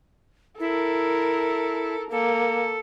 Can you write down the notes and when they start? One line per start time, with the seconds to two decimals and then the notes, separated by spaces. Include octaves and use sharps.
0.59 E4 A4 A#4
2.11 A#3 A4